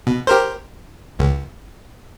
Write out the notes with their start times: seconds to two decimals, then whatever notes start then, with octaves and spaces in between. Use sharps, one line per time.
0.07 B2
0.27 G4 A#4 C5
1.19 C#2